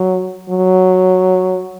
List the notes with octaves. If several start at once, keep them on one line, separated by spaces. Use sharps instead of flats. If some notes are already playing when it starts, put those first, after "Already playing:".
Already playing: F#3
F#3